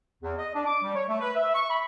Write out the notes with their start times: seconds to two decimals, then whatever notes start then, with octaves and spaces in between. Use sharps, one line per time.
0.23 E2
0.37 D#5
0.53 D4
0.65 D6
0.83 G3
0.95 C#5
1.07 A3
1.20 B4
1.35 E5
1.54 C#6
1.70 B5